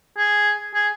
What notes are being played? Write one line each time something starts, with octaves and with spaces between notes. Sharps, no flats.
G#4
G#4